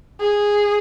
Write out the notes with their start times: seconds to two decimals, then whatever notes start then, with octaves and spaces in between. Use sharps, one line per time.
0.20 G#4